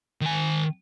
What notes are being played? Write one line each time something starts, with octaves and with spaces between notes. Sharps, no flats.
D#3 G#5